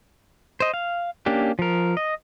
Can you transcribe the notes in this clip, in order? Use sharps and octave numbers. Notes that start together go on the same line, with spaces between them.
C5 D#5
F5
A#3 C#4 D4 G4
F3 A#4
D#5